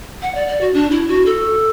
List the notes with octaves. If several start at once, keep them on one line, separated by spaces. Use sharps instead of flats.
F#5
D5
D5
F#4
D4
E4
F#4
A4